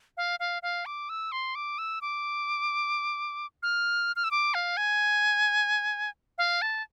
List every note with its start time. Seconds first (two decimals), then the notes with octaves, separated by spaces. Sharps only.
0.17 F5
0.40 F5
0.63 F5
0.86 D6
1.09 E6
1.32 C6
1.55 D6
1.78 E6
2.01 D6
3.63 F6
4.16 F6
4.24 E6
4.31 D6
4.54 F5
4.77 G#5
6.38 F5
6.62 A5